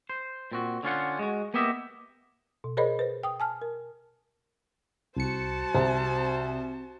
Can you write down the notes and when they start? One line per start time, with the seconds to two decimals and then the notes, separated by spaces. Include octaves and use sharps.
0.10 C5
0.52 A#2 C4 F#4
0.83 D3 C#4 F4 F#5
1.19 G#3 F#4
1.54 A#3 B3 G4 D#5 E5
2.64 B2
2.77 G#4 A#4 C5 C#5 D#5 B5
2.99 B4 C5
3.23 G5 D#6
3.40 G#5 A5 F6
3.62 A#4
5.17 C2 F#4 C5 A5 C#7
5.75 C2 C4